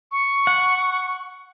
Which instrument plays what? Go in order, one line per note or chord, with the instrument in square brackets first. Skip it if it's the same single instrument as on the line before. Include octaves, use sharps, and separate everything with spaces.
[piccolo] C#6
[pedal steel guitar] F#5